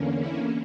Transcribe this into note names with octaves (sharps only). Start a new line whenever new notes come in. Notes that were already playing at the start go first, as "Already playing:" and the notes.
Already playing: E2 D3 A#3 C#4
E4